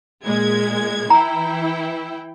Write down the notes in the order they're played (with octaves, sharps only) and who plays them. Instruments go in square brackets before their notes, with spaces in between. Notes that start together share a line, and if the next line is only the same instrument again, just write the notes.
[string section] A#2 G#3 G#6
[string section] E3 E4 G5 [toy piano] A#5